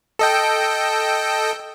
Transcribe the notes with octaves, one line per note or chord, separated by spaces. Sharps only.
A4 D#5 G5